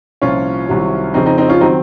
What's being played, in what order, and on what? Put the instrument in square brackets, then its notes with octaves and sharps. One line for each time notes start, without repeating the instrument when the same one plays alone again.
[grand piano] C2 A#2 F3 C#4 F4
C2 C3 D#3 F#3
F2 C#3 F3 C4 D#4
C4 D#4
C4 D#4
C#4 F4
D#3 F#3 C4 D#4